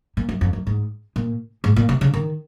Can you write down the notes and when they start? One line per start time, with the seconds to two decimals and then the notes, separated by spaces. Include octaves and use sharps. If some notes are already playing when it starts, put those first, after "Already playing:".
0.17 A#2
0.29 F#2
0.41 F2
0.53 F#2
0.67 G#2
1.16 A#2
1.64 G#2
1.76 A#2
1.89 C3
2.01 C#3
2.14 D#3